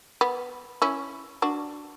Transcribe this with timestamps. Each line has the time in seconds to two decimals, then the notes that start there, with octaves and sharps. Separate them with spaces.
0.21 B3
0.82 C#4 E4
1.42 D4 F#4